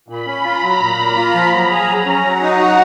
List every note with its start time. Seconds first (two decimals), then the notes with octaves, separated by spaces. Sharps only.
0.08 A#2 B5
0.27 C#4
0.44 F4 A#5
0.63 F#3
0.80 A#2 A#5
0.99 A#3
1.16 F4
1.34 F3
1.52 F#3
1.71 G#4
1.88 F#3
2.06 C#4
2.24 F#3 F#5
2.42 D#4
2.60 F#4